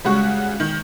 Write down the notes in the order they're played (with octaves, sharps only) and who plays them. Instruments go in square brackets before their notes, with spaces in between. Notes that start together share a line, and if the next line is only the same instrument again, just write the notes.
[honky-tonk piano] C#3 G3 F#4 [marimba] G#3 C#6
[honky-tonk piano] D#3